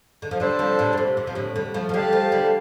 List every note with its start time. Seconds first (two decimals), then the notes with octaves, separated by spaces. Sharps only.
0.22 D3
0.31 F3
0.40 D3 G3 D4 A4 C5 A5
0.59 C3 F3
0.79 A2 D3
0.93 A2
0.98 C3
1.17 C3
1.27 F3
1.35 A2 D3
1.56 D3 G3
1.74 F3 A3
1.89 F3
1.94 D3 G3 G4 F5 A5
2.13 F3 A3
2.32 D3 G3